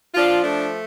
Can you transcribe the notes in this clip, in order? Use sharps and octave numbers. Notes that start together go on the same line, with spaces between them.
F3 D4 F4
A3 D4